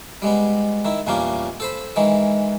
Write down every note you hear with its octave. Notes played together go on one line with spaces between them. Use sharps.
G3 G#3 B3
D#3 E4
E2 A#2 G3 A#3 C#4 D4
A4 C5 B5
D#3 E3 G#3